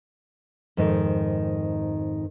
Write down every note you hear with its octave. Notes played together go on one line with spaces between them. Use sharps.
F2 G#2 D#3